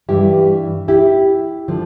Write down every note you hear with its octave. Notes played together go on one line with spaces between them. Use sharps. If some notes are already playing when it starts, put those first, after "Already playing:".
G2 E3 E4 G4
E4 G4
D3 F3